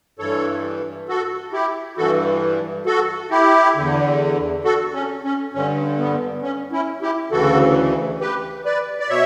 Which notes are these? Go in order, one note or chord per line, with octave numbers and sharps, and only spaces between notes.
G2 E3 A4 C#5
F#4 A4
E4 G4
G2 E3 F#4 A4
F#4 A4
E4 G4
E2 D3
F#4 A4
C#4
C#4
G2 D3 C#4
B3
C#4
C#4 E4
E4 G4
D2 C#3 E3 F#4 A4
G4 B4
B4 D5
D5
B2 C#5 E5